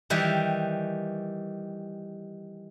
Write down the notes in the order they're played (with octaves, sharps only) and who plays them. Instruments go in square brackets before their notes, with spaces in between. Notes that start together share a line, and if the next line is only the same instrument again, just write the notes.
[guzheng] D#3 E3 G3